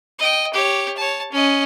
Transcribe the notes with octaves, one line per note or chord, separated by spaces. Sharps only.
D#5 G5
G4 C#5
C#5 A5
C#4 D#5